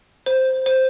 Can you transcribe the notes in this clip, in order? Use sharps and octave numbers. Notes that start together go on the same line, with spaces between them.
C5
C5